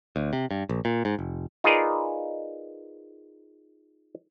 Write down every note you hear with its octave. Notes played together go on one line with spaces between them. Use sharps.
D2
C3
G2
A#1
A#2
G#2
F1
D#4 F4 G#4 A#4 B4 D5